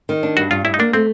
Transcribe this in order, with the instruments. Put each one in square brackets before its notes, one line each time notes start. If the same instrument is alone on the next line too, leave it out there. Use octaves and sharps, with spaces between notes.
[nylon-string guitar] D#3
D4
[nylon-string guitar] G2 [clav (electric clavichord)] F#4
[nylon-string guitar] G2 [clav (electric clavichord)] F4
[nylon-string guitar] G2 [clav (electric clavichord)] E4
[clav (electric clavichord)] D#4
[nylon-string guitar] A#3 [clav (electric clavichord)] D4
[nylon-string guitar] A3 [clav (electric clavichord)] C4